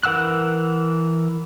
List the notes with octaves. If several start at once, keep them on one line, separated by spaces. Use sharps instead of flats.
E3 A#4 F#5 E6 F#6